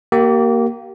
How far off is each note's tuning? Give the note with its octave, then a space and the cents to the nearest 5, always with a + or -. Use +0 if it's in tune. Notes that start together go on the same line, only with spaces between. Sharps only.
A#3 +0 G4 -30